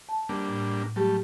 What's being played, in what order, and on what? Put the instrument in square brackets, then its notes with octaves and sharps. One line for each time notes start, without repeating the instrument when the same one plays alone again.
[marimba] A5
[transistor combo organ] G3 A#3 D4
[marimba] A2
[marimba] F#3 G4 [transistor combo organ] G3 A3